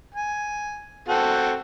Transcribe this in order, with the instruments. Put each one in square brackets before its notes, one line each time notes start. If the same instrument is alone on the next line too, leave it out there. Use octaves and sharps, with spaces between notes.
[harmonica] G#5
C4 F#4 A4